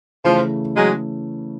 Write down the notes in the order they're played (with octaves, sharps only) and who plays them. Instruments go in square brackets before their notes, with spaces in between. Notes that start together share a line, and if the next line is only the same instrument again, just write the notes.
[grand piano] C#3 E3 A3 [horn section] F3
[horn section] F#3 G#3